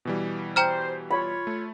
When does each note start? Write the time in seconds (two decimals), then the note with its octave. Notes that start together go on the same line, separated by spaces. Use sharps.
0.05 B2 E3 G3
0.56 C5 G5 A#5 F6
1.10 F4 C#5 B5
1.47 A3